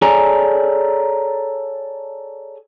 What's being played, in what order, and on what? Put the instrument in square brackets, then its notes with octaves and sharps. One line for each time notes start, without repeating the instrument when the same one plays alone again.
[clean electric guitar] G#4 A4 C#5 D5 G#5 A#5